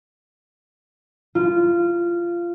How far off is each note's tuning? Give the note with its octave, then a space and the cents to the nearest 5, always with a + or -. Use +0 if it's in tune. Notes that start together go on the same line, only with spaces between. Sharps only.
F4 -15